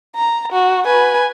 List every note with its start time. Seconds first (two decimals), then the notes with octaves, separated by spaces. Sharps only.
0.16 A#5
0.52 F#4
0.85 B4 G#5